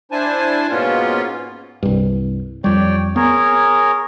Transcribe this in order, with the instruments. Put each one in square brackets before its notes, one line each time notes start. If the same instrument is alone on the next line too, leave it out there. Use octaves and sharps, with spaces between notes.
[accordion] D4 E4 C5 G#5 A5
G#2 B2 A#3 B3 C#4 F4
[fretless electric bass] C2 G2
[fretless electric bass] F2 G3 [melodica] C#5 D5 G5
[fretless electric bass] B3 [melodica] G#4 A#4 C#5